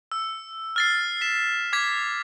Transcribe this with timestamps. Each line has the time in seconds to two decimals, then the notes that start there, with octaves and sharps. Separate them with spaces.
0.12 E6
0.76 F6 A6 C7
1.21 B6 E7
1.73 D6 G#6 B6